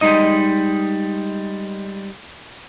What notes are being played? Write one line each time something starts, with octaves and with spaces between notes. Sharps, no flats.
G3 G#3 D#4 D#5